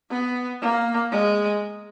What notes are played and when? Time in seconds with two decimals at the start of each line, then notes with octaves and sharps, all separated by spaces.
0.10 B3
0.62 A#3
1.12 G#3